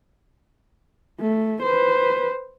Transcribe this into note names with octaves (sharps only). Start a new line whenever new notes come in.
A3
B4 C5